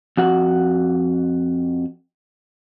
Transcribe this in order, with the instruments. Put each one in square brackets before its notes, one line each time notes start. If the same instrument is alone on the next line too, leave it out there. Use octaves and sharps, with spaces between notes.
[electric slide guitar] F2 F#4 F#5